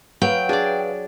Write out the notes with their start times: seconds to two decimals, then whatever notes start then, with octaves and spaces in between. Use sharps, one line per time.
0.22 F#3 B4 F5 G5
0.49 D4 G#4 D5